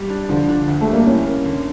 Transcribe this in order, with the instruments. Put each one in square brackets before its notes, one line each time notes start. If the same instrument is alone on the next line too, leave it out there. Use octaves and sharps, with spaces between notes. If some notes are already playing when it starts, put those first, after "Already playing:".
Already playing: [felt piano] G3
D4
[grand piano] D3 [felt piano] F3
[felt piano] D4
D2
[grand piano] A3
[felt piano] G3
[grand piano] A#3
[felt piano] A2 [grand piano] C#4
[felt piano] A#3
D3